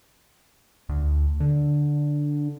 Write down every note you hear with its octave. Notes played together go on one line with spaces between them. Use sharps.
D2
D3